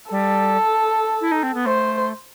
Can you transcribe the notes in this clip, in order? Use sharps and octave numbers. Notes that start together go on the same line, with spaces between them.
G3 A4
E4
D#4
C4
B3
A3 C5